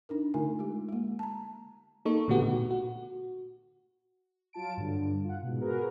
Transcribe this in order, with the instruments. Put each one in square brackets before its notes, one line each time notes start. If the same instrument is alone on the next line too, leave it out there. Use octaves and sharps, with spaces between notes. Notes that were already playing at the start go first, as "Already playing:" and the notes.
[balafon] D4 D#4 A#4
D3 A3 D#4 F4 A#4 G#5
G#3 G4
G#3 A#3
A5 A#5
[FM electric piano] A#3 D#4 A4 C#6
A#2 D3 A3 B3 F#4 G4
A#2
F#4
[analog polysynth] F#3 F4 A5 D7
G2 D3
F4 F#5
G#2 B2
F#4 G#4 A#4 B4